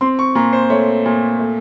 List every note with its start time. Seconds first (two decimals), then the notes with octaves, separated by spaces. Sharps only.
0.01 C4 C6
0.19 C#6
0.35 A#2 A#5
0.53 C5
0.70 A3 C#5
1.06 A#2
1.39 A3